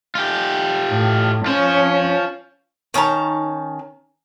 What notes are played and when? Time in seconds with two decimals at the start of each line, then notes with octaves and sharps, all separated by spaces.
0.15 F4 G4
0.89 A2
1.46 C#4 F4 C5
2.94 D#3 C#4 A5 A#5